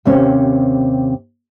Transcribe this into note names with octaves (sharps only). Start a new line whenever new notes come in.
D#2 C3 C4 C#4